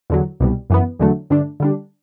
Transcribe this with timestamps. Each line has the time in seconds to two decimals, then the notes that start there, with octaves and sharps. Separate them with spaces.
0.10 E2 D3 F#3
0.40 C2 B2 G3
0.70 F#2 E3 B3
0.99 E2 D3 F#3 A3
1.30 G2 D3 A3 D4
1.60 D3 G3 D4